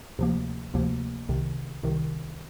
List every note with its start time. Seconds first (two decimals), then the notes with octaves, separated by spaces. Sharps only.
0.19 D2 C3 F3 A#3
0.74 D2 C3 F3 A#3
1.29 C2 C3 D#3
1.83 C2 C3 D#3